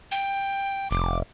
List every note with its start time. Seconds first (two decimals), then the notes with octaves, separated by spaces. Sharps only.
0.11 G5
0.91 F1 D6